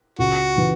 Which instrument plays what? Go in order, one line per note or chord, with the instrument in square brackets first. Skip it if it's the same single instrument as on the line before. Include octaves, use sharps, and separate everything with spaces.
[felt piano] C#2 [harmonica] F#4
[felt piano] C#3 E3